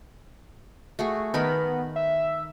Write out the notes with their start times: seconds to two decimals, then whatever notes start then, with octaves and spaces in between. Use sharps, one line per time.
0.99 A3 F#4 G#4
1.34 D#3 B3 A#4 B5
1.96 E5